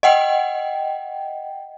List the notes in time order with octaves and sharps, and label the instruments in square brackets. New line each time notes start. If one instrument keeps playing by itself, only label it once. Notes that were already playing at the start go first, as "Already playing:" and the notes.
[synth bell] D#5 F#5 G5